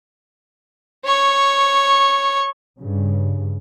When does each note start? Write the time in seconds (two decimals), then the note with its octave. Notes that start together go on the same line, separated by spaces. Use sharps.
1.05 C#5 C#6
2.81 G2 C#3